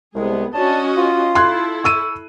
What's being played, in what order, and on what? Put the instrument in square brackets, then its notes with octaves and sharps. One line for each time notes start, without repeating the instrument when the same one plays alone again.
[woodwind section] C2 G#3 [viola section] B3 G#4
[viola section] C#4 F#4 D#5 [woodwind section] D4 C#5 A5
[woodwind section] F4
[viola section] E4 A4 [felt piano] C6 F#6 G#6
[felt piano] C#6 E6 D#7